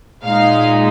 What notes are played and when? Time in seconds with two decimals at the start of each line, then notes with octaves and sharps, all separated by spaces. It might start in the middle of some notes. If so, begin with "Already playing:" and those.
0.24 A#2 G#3 D#4 F5